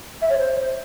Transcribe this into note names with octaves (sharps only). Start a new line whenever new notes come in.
E5
C#5
C5